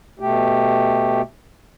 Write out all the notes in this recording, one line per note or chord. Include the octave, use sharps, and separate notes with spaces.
B2 A3 G4